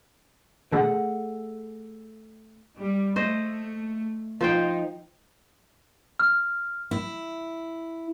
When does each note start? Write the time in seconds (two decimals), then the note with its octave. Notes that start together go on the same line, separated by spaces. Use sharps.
0.72 B2 D3 A3 G#4 F#5
2.78 G3
3.16 A3 C5 D#5
4.41 F3 D#4 C5 G5
6.20 F6
6.91 E4